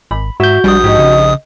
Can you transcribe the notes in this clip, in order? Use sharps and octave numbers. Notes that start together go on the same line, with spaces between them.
G#1 B5
G#2 F#4 E5 G6
A#1 G3 C#4 D4 D#6
G#2 D#4 G4 D#5
C#3